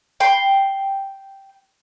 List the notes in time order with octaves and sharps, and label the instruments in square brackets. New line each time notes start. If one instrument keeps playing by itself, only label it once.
[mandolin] G5 C6